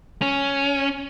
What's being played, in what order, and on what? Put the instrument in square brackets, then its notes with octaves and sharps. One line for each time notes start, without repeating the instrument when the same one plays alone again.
[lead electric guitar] C#4